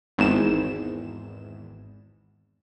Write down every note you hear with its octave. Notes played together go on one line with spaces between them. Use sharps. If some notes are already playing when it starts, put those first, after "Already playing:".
G#1 E2 G#2 E7